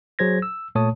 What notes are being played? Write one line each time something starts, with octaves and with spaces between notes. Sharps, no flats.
F#3 G#4 C5 G#6 A#6
E6
A#2 A3 C#5 A5 D#6